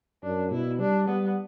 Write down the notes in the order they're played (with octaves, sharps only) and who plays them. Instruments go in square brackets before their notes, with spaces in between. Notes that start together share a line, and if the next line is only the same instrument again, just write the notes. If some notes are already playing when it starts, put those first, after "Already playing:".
[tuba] F#2 [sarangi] D4
[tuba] B2 [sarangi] E4
[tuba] G3 [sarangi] D4
[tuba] G3 [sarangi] B3